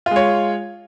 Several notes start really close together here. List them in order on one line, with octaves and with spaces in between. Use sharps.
F4 G#3 C#5